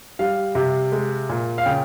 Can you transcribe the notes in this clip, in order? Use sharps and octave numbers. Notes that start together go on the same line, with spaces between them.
G3 F5
C3
G#3
A#2
F5
C#3 G5